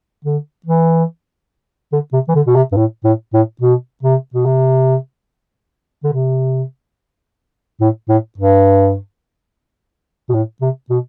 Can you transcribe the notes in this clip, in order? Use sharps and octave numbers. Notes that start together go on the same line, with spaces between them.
D3
E3
D3
C3
E3
D3
B2
C3
G2
A2
A2
A2
B2
C3
B2
C3
D3
C3
A2
A2
G2
B2
A2
C3
B2